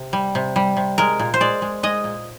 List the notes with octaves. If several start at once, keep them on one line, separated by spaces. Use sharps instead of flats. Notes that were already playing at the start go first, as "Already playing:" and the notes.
Already playing: C3
G3
C3
G3
C3
G#3 A#4
A#2
C5
G#3 D5
G#3
G#3 D#5
A#2